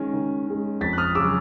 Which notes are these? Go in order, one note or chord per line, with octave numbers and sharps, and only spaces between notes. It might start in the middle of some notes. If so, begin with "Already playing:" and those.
Already playing: D#3 G#3 C#4
D#3
G#3 C#4
F2 A6 B6
F#6
D#6 F6
C#3 F#3 D6 E6